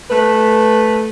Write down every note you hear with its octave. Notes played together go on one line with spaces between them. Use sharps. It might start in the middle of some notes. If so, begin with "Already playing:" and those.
A3 B4